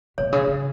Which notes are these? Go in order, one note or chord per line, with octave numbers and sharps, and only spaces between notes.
B2 C#5
C#3
C#3